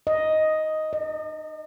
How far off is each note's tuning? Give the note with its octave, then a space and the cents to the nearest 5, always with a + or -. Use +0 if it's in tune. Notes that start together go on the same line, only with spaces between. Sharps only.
D#5 +5
D#5 -40